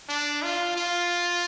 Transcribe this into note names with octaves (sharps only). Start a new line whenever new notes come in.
D4
F4
F4